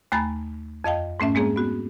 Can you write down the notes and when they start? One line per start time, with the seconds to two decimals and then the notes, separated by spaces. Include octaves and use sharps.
0.12 D#2 A3 G#5 A#5 B5 A6
0.84 F2 D#5 F5 G5
1.20 G#2 A3 C#4 E5
1.35 G#3 A#3 C4 G#4
1.56 B3 F#4